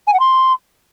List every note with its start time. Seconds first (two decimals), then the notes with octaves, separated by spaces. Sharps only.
0.07 G#5
0.13 F#5
0.19 C6